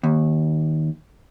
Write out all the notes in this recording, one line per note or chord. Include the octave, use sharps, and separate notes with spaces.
D#2